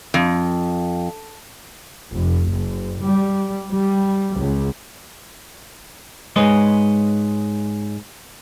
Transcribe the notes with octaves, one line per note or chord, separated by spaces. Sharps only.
F2
F1
F#1
G3
G3
C#2
G#2 G#3 B4 C#5 D#5